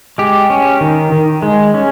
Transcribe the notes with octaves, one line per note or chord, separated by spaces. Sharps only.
G#3 G4
C#4
D#3
D#3
G#3
C#4